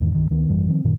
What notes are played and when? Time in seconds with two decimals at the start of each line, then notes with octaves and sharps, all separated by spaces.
0.01 E1 E2 G#2 D#3
0.15 C2 G2 D#3
0.30 D2 D#3 A3 B3
0.49 G#1 F#2 E3 G3
0.69 D#3 F3 C4
0.84 F#2 A#2 D#3